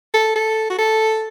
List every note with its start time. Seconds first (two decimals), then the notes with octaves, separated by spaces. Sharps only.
0.14 A4
0.36 A4
0.70 F#4
0.78 A4